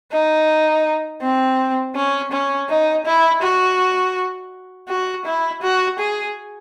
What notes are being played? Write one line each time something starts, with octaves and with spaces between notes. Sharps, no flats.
D#4
C4
C#4
C#4
D#4
E4
F#4
F#4
E4
F#4
G#4